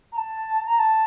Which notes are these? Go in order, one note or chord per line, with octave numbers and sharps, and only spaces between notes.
A#5
A5
A#5
A5